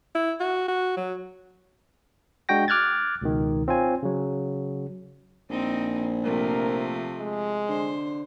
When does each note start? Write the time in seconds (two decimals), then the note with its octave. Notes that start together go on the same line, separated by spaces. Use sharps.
0.15 E4
0.40 F#4
0.68 F#4
0.96 F#3
2.49 G#3 D4 F#4 G5 A#6
2.68 D6 F6 F#6 G#6 A6
3.22 C#2 B2 D#3
3.68 C4 F4 C#5 G#5
4.03 C#3 F#3
5.50 A#1 C4 D#4
6.24 C3 F3 A3 A#4
7.18 G#3
7.69 D3 C5